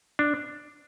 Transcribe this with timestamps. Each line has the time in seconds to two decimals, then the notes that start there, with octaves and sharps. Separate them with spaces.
0.19 D4